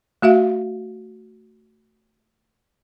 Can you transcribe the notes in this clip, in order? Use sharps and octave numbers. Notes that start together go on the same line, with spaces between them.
A3 F#4 E5 F5